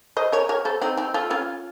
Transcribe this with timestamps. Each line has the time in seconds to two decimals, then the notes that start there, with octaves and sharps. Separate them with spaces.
0.17 C5 D#5
0.32 A#4 C#5
0.49 A#4 C#5
0.65 A4 C5
0.82 C4 D#4
0.97 C4 D#4
1.14 F4 A4
1.31 C#4 F4